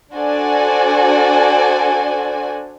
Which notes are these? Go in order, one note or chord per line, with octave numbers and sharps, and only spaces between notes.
D4 F#4 A4 C5 D5 G#5